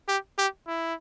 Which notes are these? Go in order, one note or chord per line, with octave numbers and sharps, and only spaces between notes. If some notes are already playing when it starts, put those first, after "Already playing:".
G4
G4
E4